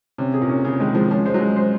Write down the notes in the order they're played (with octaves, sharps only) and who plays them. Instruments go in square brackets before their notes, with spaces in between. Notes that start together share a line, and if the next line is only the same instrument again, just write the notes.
[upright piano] C3 [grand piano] C#4
[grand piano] G#4
[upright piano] A#2
[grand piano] C#4
[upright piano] C#3 [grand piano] G#4
[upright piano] D#3 [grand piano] G#3
[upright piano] F3 [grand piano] G#3
[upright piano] F3 [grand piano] C#4
[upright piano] G#3 [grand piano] C5
[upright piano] F#3
[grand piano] G#3
C5